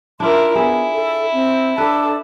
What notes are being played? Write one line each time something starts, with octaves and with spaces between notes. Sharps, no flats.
D4 E4 F4 A#4 C6
B3 E4 G#4
A4
C4
D4 A4 B4